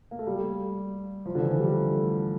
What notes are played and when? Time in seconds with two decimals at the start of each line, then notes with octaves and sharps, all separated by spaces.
0.11 A#3
0.19 A3
0.27 G3
1.26 F3
1.35 D3
1.42 E3
1.59 G3
1.75 A3